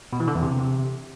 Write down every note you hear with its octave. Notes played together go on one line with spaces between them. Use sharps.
B2
E3
D3
E2
C3